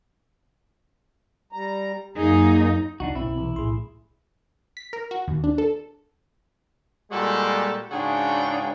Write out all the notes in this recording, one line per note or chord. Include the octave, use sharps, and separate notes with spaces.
G3 A#5
F#2 A#3 D#4 G#4 G#5
C#2 D4 D#4 F#4
B1 B2 C4 C#4 E4
C3 E3
B1 A2 G#4 C6
B6
A#4
F#4
D#2
D4
A4
A#2 G3 G#3 F#4 G4 A4
G#2 C#3 D4 F#4 G#4 G5